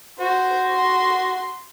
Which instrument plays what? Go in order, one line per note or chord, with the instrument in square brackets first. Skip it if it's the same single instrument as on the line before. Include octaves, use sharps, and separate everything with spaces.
[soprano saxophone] F#4 [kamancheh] C5
[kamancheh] C6